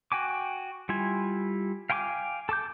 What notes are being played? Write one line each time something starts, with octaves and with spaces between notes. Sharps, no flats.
F#4 G5 G#5 D6
G3 E4 F4 G#5
F5 G5 G#5 C6 D6
A4 A5 D6 G6